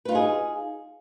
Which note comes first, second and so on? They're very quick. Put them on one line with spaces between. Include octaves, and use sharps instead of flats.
B4 F4 D#4 G#4